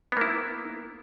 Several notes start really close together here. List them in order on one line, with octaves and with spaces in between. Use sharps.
B3 A#3 E4